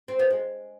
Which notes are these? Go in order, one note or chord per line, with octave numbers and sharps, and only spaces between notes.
C4
B3
G#3